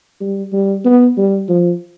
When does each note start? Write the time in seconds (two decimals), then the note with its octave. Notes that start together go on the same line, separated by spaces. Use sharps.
0.21 G3
0.53 G3
0.85 B3
1.18 G3
1.49 F3